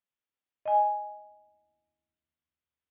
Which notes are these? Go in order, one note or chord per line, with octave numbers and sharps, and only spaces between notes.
D#5 G#5